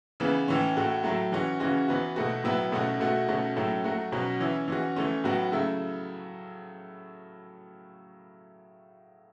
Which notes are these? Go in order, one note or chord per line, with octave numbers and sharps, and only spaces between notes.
C#3 E3 B3
A2 E3 C#4
A2 A3 F#4
A2 F#3 A3
E3 C#4 F#4
C#3 E3 C#4 F#4
E3 B3 F#4
B2 A3 F#4
A2 F#3 B3 E4
B2 A3 C#4 F#4
B2 A3 F#4
B2 A3 C#4 F#4
A2 F#3 A3 C#4
F#3 A3 F#4
B2 F#3 C#4 F#4
E3 C#4 E4
E3 C#4 F#4
E3 A3 C#4
A2 F#3 B3 F#4
C#3 F#3 A3 E4